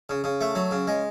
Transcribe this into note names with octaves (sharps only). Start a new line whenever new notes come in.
C#3
C#3
A3
F#3
C#3
G#3